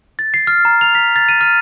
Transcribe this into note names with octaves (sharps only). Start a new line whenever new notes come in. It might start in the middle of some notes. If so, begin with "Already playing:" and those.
A6
C7
F6
A#5
F7
B6
A6
D#7
F6